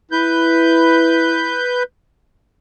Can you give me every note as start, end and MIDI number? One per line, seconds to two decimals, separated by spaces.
0.12 1.60 64
0.12 1.83 71
0.12 1.83 91